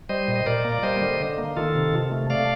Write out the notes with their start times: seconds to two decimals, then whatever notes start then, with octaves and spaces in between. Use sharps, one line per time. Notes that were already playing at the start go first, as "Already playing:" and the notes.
0.09 G3 C5 D#5
0.28 A#2
0.36 D#5
0.46 A#2 A#4 D5
0.65 A#3
0.72 D5
0.83 G3 C5 D#5
1.01 D3
1.20 D3
1.38 A#3
1.56 D#3 F4 A4
1.75 C3
1.93 C3
2.11 A3
2.30 A3 D5 F5